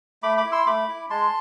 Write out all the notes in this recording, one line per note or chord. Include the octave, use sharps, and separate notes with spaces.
A3 B5 D6
B5 D6
E4
C6 E6
A3 B5 D6
E4
G#3 A5 C6